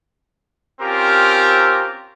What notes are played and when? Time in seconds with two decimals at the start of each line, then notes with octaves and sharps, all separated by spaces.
0.80 C4 C#4 F4 G4 A#4